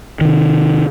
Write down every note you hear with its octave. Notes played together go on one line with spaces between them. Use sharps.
C3 D#3